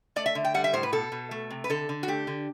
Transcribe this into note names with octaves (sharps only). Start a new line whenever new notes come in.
A3 D5
E5
D3
G5
G3 F#5
E5
A2 C5
B4
B2 A4
B2
A3
C3
B4
D3 A4
D3
F#4
A3 G4
D3